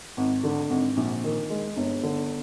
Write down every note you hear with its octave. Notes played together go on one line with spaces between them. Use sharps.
G#1
D3
G#1
A#1
D#3
G#3
G1
D3